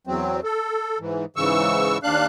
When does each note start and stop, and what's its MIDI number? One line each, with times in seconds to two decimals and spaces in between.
0.07 0.40 40
0.07 0.40 54
0.07 0.40 60
0.44 0.99 69
0.99 1.25 44
0.99 1.25 52
1.36 1.98 44
1.36 1.98 49
1.36 1.98 52
1.36 1.98 85
1.36 1.98 88
2.03 2.26 39
2.03 2.26 62
2.03 2.26 77
2.03 2.26 90